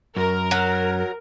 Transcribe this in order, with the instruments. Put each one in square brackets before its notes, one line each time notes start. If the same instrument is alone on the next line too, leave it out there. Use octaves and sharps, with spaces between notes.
[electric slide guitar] F#2 [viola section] A#4
[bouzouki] F#3